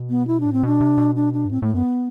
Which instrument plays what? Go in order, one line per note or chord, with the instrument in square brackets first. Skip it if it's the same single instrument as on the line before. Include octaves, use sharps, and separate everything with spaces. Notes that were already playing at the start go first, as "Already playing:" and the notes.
Already playing: [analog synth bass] B2
[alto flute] B3
E4
D4
[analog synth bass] A2
[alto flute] C4
[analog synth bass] B2 [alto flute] D4
[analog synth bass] C3
B2
[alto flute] D4
D4
[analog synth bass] G2
[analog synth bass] A2 [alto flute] C4
[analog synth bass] A2 [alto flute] A3
[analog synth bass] F#2 [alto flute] B3